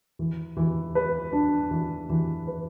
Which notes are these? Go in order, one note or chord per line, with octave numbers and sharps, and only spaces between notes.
E3
E3
B4
D4
E3
E3
B4